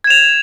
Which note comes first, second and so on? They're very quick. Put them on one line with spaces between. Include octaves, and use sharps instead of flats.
G#6 E7 F7